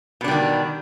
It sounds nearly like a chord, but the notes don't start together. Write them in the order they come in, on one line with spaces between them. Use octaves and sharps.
B2 D4 G3 D#3